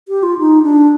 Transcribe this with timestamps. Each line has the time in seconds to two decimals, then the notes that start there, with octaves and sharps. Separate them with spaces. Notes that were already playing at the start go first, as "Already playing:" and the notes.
0.08 G4
0.23 F4
0.39 D#4
0.63 D4